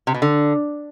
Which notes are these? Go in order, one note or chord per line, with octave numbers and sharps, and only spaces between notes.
C3
B2
D3